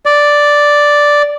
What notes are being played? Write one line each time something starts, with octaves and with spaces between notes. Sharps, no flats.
D5